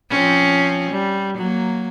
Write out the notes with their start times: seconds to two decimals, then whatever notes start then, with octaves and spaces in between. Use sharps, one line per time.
0.10 F3 C4 C#4
0.91 G3
1.37 F#3 A#3